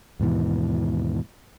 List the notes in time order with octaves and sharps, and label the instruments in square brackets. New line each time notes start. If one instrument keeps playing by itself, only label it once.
[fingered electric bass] D#2 G#2 B2 E3